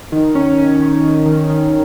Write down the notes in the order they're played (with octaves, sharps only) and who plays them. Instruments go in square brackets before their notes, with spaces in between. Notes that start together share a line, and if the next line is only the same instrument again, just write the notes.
[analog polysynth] D#3
C#4
C#4
D#3
D#3
D#3
D#3